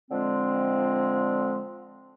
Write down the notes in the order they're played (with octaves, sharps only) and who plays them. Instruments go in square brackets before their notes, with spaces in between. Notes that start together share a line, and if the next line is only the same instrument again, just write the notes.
[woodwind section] D3 F3 G#3 C4